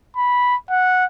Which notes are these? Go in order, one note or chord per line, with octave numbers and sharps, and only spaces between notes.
B5
F#5